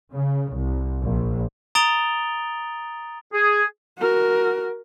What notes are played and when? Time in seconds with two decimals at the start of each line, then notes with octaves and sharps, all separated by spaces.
0.13 C#3
0.55 C2
1.03 A#1
1.75 A#5 D#6 A6 D7 F7 G7
3.33 G#4
3.98 F#4 A#4